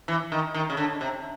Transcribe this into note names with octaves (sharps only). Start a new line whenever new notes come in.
E3
D#3
D#3
C#3
D3
C3